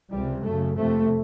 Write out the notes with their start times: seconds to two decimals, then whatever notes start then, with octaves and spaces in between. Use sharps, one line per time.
0.11 C#2 C3 G3
0.44 F#2 C#3 A3
0.77 F2 C3 A3